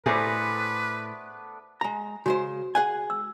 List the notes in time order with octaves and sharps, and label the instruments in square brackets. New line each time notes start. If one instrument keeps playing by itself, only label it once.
[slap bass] A2 [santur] A3 B3 D4 [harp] G#4 C5 C#7 [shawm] B4
[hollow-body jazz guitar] G#3 A#5
[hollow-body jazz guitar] C#3 G#3 C5 [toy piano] F#4
[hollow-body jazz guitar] G#4 F#5 G#5
[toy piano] E6